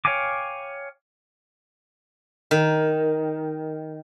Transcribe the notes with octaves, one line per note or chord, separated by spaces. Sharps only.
C#5 F5 G5 G#5 D6
D#3